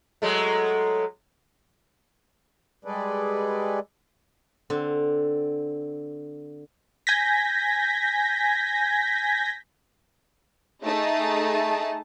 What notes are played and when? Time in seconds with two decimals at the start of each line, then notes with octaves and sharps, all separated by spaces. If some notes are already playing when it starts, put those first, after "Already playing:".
0.22 F#3 G#3 A3
2.85 G3 G#3 G#4 A4 B4 D5
4.70 D3 C4
7.07 G#5 G6 G#6 A#6 B6
10.84 A3 D#4 G#4 A5